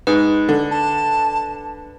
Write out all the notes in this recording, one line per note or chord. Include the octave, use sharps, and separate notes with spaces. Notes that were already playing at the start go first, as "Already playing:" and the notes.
G#2 B4
D3
A5